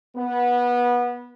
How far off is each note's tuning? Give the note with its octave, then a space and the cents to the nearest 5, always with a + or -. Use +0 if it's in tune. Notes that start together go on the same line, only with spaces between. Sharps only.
B3 -20